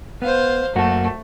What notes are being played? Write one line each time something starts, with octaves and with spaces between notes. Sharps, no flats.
B3 C5 F5
F#2 A3 A#3 F#4